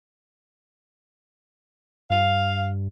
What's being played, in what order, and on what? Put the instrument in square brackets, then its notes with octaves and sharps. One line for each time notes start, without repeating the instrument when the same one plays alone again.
[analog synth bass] G2 [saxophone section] F5